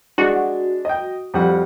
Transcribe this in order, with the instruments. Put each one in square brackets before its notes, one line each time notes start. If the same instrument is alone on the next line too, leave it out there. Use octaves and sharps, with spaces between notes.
[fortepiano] G#3 D4 [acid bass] F#4
[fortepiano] D#5 G5
F2 G3 F#5